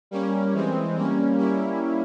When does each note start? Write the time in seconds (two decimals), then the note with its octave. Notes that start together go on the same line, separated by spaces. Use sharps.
0.11 G3 A#3 C#4
0.54 E3 G#3 C4
0.95 G3 A#3 C#4
1.38 G3 A#3 C#4 E4